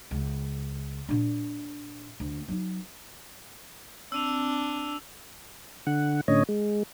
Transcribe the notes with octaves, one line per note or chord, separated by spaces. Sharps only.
C#2
A#2 D4
D2
F#3 D#4
C4 D4 E6 D#7 F7
D3 F#5
A2 D3 C#4 C#5 D#5
G#3